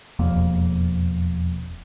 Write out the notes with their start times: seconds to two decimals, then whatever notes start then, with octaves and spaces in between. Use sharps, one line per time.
0.19 E1 F2 A#3